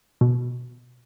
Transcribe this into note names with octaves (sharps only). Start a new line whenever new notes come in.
B2